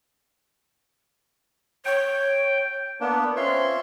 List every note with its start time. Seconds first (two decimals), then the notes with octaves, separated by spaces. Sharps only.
1.85 C#5 G5
3.00 A#3 B3 D4
3.36 C4 C#4 F4 C#5 E5 C6